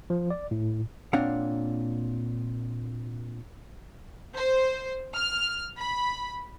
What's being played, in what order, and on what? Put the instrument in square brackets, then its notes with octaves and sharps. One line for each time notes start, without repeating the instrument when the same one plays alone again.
[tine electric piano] F3
D5
A2
[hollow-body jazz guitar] A#2 C4 D4 C#5 F5 F#5
[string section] C5
F6
B5